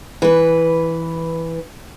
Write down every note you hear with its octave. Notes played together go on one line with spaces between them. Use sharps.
E3 B4